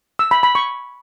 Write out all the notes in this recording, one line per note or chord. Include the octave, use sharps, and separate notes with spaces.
E6
B5
B5
C#6